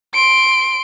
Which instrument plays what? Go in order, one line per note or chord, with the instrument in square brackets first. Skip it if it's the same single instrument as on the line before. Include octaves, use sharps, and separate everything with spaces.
[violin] C6 D7